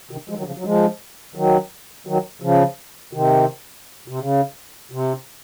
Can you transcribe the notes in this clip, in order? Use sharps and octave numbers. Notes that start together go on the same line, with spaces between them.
C3 D#3
F3 G#3
D#3 F#3
C#3 F3
F#3
F3 G#3
D#3 F#3
D#3 F#3
C#3 F3
C3 D#3
C3
C#3
C3